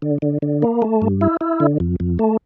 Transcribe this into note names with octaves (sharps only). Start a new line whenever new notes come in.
D3
D3
D3
A#3
A3
G2
E4
E4
D3
F2
F2
A3